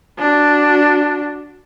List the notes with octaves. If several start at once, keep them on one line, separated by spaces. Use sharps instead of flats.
D4 F#4